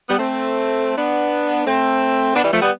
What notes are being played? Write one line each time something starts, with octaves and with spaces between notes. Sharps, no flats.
G3 B3
A3 C4
B3 D4
A3 C4
B3 D4
E3 G3
F3 A3
G3 B3